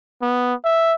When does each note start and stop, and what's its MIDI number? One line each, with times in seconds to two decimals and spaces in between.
0.22 0.54 59
0.65 0.94 76